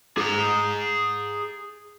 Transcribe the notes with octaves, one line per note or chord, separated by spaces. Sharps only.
G#4 A#5